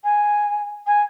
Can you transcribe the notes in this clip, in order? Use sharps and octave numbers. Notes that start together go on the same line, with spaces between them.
G#5
G#5